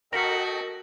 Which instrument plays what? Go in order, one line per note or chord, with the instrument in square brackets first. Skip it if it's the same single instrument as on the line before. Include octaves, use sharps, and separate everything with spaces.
[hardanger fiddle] F#4 [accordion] A4 D#5 G5 [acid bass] A#4 [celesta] A#6 B6 C#7